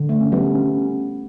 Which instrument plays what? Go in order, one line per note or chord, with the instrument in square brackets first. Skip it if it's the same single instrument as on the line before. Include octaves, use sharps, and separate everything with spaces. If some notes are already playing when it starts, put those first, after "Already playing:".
Already playing: [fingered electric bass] D3
[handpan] A3
[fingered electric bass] C#4
[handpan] G3 B3
[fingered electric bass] C#4